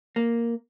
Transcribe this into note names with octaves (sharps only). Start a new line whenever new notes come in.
A#3